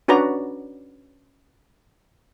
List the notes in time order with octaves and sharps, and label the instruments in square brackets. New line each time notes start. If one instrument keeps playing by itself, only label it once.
[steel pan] C#4 D4 F#4 B4 D5 A#5